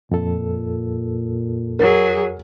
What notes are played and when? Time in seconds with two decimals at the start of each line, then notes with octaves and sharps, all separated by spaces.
0.11 F2 A#2 A4
1.79 F#3 G#4 A#4